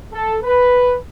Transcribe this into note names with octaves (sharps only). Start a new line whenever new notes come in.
A4
B4